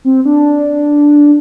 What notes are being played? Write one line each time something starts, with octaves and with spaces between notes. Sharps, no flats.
C4
D4